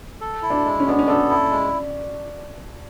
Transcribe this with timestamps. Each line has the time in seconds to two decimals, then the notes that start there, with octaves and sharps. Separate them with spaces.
0.21 A4
0.42 E4
0.50 D4
0.65 G#3
0.80 C#4
0.87 B3 D4
0.99 C#4
1.08 D4 A4
1.30 E4
1.51 G#3